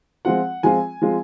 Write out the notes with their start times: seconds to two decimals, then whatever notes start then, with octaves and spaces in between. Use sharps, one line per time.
0.25 F3 G#3 C4 F4 F#5
0.63 F3 G#3 C4 F4 G#5
1.02 F3 G#3 C4 F4